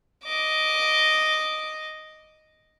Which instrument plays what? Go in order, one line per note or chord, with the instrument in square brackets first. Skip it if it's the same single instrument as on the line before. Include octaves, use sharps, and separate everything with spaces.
[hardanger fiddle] D#5 D6